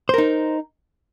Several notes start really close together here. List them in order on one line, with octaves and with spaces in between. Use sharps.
C5 A#4 D#4